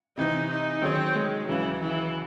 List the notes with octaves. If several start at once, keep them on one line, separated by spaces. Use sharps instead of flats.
C3 E3 C4 D#4
D#4
D#3 F#3 C4 C#4 G#4 C#5
G#3
C#2 C#3 E3 F#3
E3